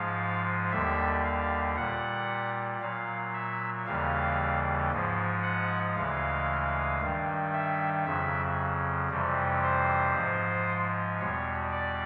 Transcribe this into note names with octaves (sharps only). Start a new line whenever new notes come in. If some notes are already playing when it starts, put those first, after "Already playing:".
Already playing: G#2 F3 G#3 F5
D#2 D3 G3 E5
F5
A#2 G3 F#5
A#2 F#3 F5
E5
D#2 C#3 E3 G3 F5
G#2 F3 G#3
F#5
D2 C#3 E3 G#3 F5
G2 D#3 G3
E5
F2 C#3 F#3 E5
F2 C3 E3 G3
C5
G#2 F3 G#3
E2 B2 G3 C#5
D5